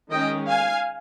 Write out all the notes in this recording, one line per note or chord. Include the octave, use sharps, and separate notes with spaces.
D#3 G#3 C#4 D#5 G5
F5 G#5